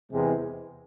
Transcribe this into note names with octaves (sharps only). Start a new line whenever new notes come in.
E2 C3 E3 G#3